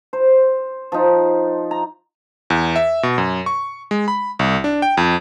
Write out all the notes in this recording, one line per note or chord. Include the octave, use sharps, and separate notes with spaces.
C5
F3 D#4
A#5
E2
E5
B2
F#2
C#6
G#3
B5
C2
D4
G5
F2